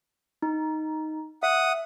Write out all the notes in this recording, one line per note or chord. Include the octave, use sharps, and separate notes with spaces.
D#4
E5 F#5 D#6